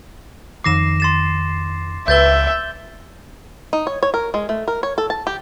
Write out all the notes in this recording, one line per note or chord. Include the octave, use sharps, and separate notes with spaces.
F2 D#3 D6 A#6 C7 E7
C6 A6 E7
C#2 B4 E5 E6 G6 A6 G7
D#4
C#5
C#5
A#4
G#3
A3
A#4
C#5
A4
A5
G4